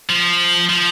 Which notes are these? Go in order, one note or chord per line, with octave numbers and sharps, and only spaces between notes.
F3
F3